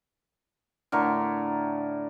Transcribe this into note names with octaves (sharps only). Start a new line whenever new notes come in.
A2 D3 A#4 C#6